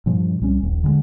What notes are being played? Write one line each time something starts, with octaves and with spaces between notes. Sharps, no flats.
G2 A#2 F3
C2 G3 C#4
D#1 A#1
D3 F#3 G#3